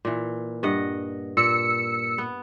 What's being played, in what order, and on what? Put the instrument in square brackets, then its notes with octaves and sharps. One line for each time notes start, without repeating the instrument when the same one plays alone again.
[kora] A#2 E3
G2 D#5 F#5
[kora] A#2 [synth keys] E6 C#7
[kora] B3